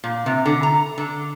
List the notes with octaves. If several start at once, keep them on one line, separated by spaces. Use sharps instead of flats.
A#2
C3
D3
A#5
D3